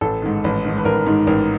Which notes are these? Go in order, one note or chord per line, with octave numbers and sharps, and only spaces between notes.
A1 A4
G#2 D#3
A1
G#2 D#3
B4
A1 A#4
G#2 D#3
A1 A#4